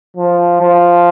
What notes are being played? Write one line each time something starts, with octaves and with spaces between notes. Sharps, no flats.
F3
F3